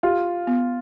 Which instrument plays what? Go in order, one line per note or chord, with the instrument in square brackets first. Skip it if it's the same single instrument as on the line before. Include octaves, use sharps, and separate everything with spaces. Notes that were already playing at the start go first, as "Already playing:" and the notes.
[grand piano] F4 [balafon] G4
[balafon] B3